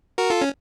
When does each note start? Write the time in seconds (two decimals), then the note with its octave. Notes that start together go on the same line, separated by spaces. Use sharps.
0.18 F#4 A#4
0.30 F4 A4
0.41 C#4